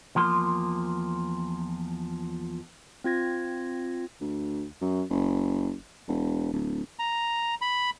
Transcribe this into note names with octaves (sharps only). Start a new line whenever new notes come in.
E2 F3 A#3 C6
C4 F4 G#6 A#6
D2
F#2
F#1
E1
D1
A#5
B5